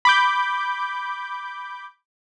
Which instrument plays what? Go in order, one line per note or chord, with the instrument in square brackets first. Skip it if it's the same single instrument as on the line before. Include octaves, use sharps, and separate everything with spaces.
[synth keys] B5 D6 G6